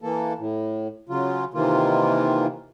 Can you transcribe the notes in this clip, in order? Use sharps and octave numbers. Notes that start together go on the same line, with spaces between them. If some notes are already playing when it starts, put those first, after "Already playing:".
E3 A#3 A4
A2
C#3 F#3 F4
C3 D#3 E3 A#3 F4